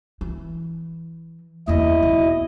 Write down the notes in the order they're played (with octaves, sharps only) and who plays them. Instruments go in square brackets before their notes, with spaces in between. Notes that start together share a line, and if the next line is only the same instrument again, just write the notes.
[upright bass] E3
[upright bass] E2 A#3 [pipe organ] E4 D#5
[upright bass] B1